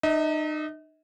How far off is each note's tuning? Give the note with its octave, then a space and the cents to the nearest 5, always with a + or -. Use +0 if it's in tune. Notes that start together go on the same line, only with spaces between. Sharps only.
D#4 -35 D#5 +45